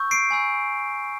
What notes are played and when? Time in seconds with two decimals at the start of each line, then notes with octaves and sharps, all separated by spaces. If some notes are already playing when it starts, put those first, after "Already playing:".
Already playing: C#6 E6 G6
0.11 C7 D7
0.30 G#5 B5 E6 G6